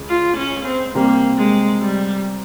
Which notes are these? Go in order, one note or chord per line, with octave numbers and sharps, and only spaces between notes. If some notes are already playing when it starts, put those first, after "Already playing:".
Already playing: C#2 C#3 G#3
F4
C#4
C4
C3 G3 A#3 C4 G4 A#4
G#3
G3